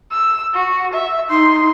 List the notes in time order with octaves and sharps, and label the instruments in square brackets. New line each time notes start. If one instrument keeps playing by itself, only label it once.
[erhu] E6
F#4
E5
[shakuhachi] D#4 [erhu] C6